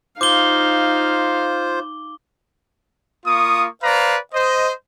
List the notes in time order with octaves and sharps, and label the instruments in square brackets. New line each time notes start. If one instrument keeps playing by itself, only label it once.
[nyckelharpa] D#4 F5 [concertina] F4 C5 [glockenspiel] D6 G7
[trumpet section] A#3 F4 C#6 D#6
B4 C5 D5 F5 A#5
C5 D#5